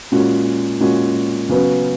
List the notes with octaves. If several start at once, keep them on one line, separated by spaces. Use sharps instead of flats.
A#2 G#3 C#4 F#4
A#2 G#3 C#4 F#4
C#3 F#3 B3 F#4 B4